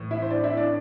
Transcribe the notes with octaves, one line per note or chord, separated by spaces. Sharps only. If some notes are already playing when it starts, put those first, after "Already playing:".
Already playing: A2 E3
E4 E5
C5
D4 D5
E4 E5
D4 D5